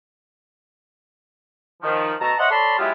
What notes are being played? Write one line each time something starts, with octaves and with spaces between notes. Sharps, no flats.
D#3 F3
B2 A3 A5 A#5
C5 C#5 D#5 E5 F#5
A4 C#5 D5 A5 B5 C6
F#3 G#3 B3 E4 F4 G4